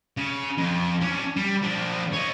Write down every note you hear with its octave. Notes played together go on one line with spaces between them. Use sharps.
C#3
F2
C#4 D4
G3
F3 D4
C#5 D#5